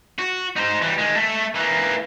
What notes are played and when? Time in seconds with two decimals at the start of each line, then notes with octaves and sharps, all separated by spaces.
0.19 F#4
0.56 D#4 C5
0.82 E3 G3
0.98 D#3 G#3
1.15 A3 A4
1.55 E3 A#3